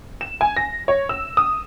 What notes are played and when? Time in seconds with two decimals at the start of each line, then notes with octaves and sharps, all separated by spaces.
0.21 E7
0.41 G#5
0.57 A#6
0.88 C#5
1.09 E6
1.37 D#6